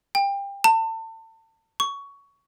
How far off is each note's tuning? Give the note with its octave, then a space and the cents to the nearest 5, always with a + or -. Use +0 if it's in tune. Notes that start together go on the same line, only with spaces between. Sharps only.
G5 +25
A5 +35
C#6 +15